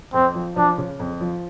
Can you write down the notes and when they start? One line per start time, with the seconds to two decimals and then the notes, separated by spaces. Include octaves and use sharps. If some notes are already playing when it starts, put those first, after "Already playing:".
0.14 F2 C4
0.35 F3
0.56 F3 D4
0.78 C#3
1.00 F2
1.21 F3